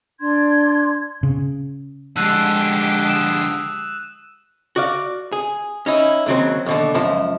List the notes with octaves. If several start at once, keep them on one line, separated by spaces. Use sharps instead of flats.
D4 C6 G#6
C#3
D3 F3 G#3 G4 G5 E6 F#6 D#7
D#6 E7
F#4 D5 F5
G#4
C#4 D#4 E4
D#2 C#3 F#3 C4
D#2 B2 D3
C#2 F#2 F3 A5